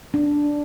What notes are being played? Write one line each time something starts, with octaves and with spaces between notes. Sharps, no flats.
D4